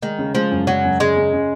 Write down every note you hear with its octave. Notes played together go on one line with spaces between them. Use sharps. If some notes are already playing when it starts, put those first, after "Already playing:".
D#3 G#3
C#3
F3 G#3
F#2
C#3 F#3
F#2
C#3 G#3
C#3
C#3